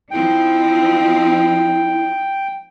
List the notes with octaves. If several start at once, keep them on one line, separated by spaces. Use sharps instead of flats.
F3 C4 D#4 E4 G5